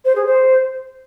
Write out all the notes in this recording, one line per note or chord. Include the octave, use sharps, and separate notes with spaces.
C5
G#4
C5